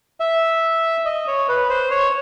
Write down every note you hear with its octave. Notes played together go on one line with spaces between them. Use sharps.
E5
D#5
C#5
B4
C5
C#5